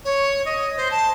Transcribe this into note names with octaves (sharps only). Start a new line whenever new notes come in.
C#5
D#5
C5
A5